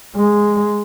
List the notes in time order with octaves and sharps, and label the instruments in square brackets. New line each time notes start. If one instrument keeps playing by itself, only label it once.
[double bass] G#3